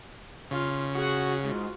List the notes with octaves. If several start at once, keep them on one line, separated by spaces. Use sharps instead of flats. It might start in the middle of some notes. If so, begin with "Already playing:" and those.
C#3 F4
F#4 G#4 F#5
G#2 F4 F#4